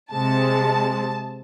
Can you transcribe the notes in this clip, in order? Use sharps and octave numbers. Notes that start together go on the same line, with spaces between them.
C3 G#3 C4 A5